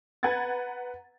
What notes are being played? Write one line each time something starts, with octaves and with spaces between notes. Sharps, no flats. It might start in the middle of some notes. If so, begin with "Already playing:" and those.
B4 F#5 A#5 G#6 A6